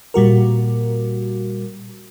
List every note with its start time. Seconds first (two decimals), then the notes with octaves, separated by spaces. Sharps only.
0.14 A#2 G3 F#4 A#4